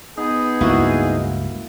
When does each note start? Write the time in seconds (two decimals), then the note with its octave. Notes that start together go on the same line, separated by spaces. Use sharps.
0.18 B3 D#4 G#4
0.61 C#2 G2 A#3 E4 F#4